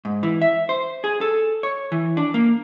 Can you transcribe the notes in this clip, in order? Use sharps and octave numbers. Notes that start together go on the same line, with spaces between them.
G#2
E3
E5
C5
G#4
A4
C#5
E3
D4
A#3